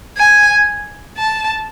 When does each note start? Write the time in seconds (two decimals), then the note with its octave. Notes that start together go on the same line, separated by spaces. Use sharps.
0.17 G#5
1.18 A5